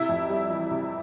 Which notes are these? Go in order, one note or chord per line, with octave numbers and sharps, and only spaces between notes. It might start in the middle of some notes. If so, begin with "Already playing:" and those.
Already playing: C3 E4 E5
F2
G3
E3
C3